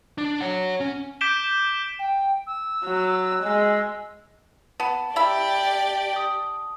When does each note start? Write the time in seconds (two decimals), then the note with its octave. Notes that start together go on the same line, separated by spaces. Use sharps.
0.18 D4
0.41 C#5 F#5
0.81 C#4
1.21 D6 G6 B6 D7 E7 G7
1.99 G5
2.46 E6
2.85 F#3
3.43 G#3
4.80 B3 A5
5.16 E4 G4 D5 E5 B5
6.16 D#6